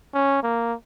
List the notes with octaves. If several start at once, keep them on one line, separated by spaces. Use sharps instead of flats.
C#4
A#3